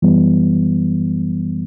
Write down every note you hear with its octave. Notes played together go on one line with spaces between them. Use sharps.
F#2 E3 G3 B3